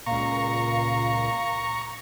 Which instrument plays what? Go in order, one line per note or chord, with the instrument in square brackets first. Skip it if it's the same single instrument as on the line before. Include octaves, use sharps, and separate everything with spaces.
[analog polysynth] C#2 A#2 [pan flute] F5 [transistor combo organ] A#5 C#6